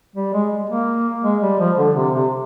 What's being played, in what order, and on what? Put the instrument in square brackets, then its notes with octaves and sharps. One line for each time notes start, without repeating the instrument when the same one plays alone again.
[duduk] G3
G#3
A#3
G#3
G3
F3
D3
C3
C3